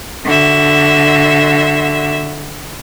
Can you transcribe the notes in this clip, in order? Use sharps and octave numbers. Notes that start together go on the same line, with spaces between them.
D3 F#4 E5